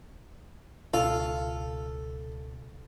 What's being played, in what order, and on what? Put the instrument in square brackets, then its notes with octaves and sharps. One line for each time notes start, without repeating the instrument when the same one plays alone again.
[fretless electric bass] C#2 B2 [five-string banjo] F4 [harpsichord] A4